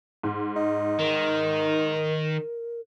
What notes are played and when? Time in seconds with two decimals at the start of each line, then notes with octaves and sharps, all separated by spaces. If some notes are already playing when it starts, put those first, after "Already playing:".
0.23 G#2
0.56 D#4
0.99 D#3 A#4